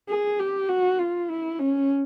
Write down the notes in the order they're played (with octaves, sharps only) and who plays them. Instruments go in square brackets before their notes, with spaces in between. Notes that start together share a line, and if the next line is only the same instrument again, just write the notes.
[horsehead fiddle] G#4
G4
F#4
F4
E4
C#4